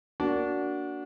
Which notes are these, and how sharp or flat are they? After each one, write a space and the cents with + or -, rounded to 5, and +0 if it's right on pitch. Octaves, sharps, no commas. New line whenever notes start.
A#3 +0 D4 -20 F#4 +0